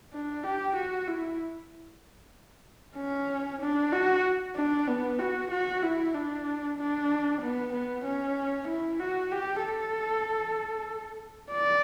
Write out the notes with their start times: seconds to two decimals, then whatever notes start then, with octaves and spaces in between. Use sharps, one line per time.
0.13 D4
0.44 G4
0.76 F#4
1.08 E4
2.97 C#4
3.61 D4
3.93 F#4
4.56 D4
4.87 B3
5.19 F#4
5.51 F#4
5.83 E4
6.15 D4
6.78 D4
7.42 B3
7.73 B3
8.05 C#4
8.68 E4
9.00 F#4
9.31 G4
9.64 A4
11.53 D5